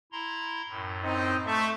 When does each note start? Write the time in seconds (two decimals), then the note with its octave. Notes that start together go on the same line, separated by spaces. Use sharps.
0.12 E4 A#5 C6
0.69 F#2 A2
1.04 C4 D#4
1.47 A3 A5 C#6 G6